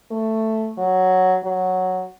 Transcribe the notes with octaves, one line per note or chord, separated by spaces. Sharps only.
A3
F#3
F#3